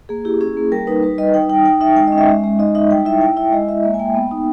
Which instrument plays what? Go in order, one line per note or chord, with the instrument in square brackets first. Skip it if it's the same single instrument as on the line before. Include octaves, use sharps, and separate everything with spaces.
[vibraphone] A#3 G#4
E4 G4
C#4 G#4
A#3
G3 A#4
D#4 B4
G3 B4
G3 D#5
D#4 G5
D#4 G5
D#4 G5
D#4 E5
G#3 G5
D#5
C#4
E5
G#3
G#3
D#4 D#5
D#4 E5
G3 G5
E4 E5
E4 G5
E4 E5
G#3 D#5
G#3 E5
A#3 E5
G#5
A#3 G5
B3
D#4